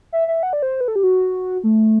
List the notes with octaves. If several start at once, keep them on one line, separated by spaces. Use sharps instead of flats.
E5
E5
F#5
D5
C5
B4
A4
G4
F#4
A3